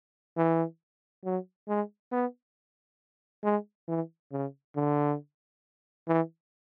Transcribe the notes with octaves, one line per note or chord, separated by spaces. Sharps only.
E3
F#3
G#3
B3
G#3
E3
C#3
D3
E3